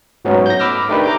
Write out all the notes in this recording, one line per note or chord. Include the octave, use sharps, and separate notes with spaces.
G#2 F#3 A3 B3 C#4 D#4
G6 A#6
B5 D6 E6 F6 A#6
A3 D4 D#4 G4 A#4 B4
A#5 D6 G6